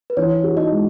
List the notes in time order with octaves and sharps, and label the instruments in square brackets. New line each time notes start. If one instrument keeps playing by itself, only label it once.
[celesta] B4
[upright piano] E3 [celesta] C#5
[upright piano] F#4
[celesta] D#4 D#5
[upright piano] G#3